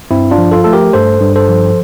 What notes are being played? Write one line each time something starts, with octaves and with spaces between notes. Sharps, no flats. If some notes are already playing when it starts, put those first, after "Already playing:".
G2 C4 E4
D4 F4
F3
F4 A4
A3 A4
G4 A#4
G2 A4 C5
G2
A4 C5
F3